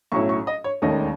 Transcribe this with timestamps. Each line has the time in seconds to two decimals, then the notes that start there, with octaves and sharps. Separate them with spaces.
0.12 B1 A2 F#3 C#4 E4 C#6
0.29 C#6
0.47 D#5
0.64 C#5
0.82 E1 D#2 D#3 A3 C#4 D#5